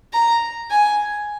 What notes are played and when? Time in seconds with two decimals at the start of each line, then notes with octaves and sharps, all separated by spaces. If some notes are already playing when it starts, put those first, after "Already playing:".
0.13 A#5
0.71 G#5